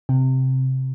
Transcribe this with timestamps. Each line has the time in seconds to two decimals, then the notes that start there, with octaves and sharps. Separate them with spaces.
0.09 C3